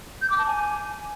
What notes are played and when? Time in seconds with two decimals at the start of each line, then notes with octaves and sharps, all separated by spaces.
0.22 G6
0.30 D6
0.38 A5
0.47 G#5